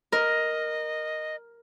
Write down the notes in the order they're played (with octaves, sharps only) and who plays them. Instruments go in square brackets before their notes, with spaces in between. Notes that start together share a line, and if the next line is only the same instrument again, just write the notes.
[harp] A#4 [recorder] D#5